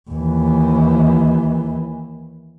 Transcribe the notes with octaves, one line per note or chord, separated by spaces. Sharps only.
D#2 E3